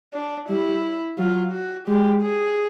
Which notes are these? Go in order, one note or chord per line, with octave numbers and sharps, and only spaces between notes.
D4
G3 E4
F#3 F4
F#4
G#3 G4
G#4